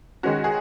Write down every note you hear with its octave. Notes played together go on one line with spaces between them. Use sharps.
D#3 G#3 C#4 F#4
G#4